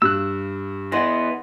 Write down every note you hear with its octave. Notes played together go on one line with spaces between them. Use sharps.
G2 E6 F#6
E3 B3 D#5 C6 A#6